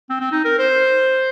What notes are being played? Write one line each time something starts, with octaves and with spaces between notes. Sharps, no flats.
C4
C4
D#4
A#4
C5